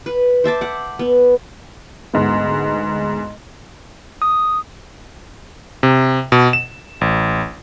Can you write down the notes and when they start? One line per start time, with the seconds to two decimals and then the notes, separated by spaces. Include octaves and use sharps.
0.06 B4
0.44 C5 E5 A5 D6
0.61 F#5 D6
0.99 B3
2.14 D2 G#2 B3
4.22 D#6
5.83 C3
6.32 B2
6.53 E7
7.01 A1